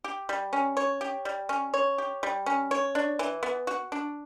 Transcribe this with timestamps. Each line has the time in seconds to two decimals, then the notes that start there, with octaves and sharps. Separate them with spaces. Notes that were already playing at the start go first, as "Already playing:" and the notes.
0.04 G4
0.29 G3
0.53 C#4
0.77 C#5
1.01 G4
1.25 G3
1.49 C#4
1.74 C#5
1.98 G4
2.23 G3
2.46 C#4
2.71 C#5
2.95 D4
3.19 E3
3.43 B3
3.67 F#4
3.92 D4